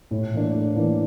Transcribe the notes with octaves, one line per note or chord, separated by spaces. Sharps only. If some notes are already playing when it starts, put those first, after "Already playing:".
A2
E3 A#3 D4
A2
E3 A#3 D4